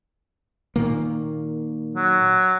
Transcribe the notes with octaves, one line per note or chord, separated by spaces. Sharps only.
A#2 D#3 A#3
F#3